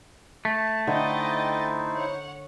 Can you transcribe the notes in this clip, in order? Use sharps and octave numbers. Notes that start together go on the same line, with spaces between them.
A3 A5
D3 D#4 E4 C5 D#5 G5 A6
C#5 F#5